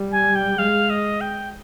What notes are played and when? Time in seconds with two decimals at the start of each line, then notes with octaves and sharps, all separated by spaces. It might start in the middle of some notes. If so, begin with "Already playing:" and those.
Already playing: G3
0.12 G#5
0.35 G5
0.58 G#3 F5
0.90 D#5
1.21 G5